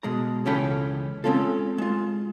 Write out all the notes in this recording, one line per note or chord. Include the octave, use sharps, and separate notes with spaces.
B2 G#3 A#5
C#2 E3 C#4 A4 G5 B5
G#3 C4 C#4 F4 A4
G#3 F4